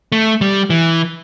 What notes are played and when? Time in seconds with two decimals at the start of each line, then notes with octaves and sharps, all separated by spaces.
0.12 A3
0.41 G3
0.70 E3